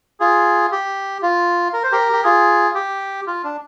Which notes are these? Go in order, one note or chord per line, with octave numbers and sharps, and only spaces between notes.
F4 G#4
G4
F4
A#4
C5
G4 A#4
G4
F4 G#4
G4
F4
D4